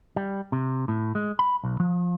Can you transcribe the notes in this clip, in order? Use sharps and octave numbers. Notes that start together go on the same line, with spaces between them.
G3
C3
A2
G#3
B5
B1
F3